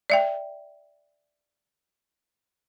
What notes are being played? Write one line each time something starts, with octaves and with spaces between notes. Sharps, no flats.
D5 E5 G5